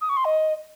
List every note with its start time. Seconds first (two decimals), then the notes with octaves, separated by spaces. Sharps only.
0.01 D#6
0.09 C#6
0.17 C6
0.25 D#5